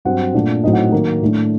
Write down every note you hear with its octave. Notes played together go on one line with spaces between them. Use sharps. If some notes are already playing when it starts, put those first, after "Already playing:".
G2 F#3 C4 F#5
A#2 A3 D4
A2 F#3 C4 D#4 D#5
F#5
D#3 F#3 A#3
A2 A3 D4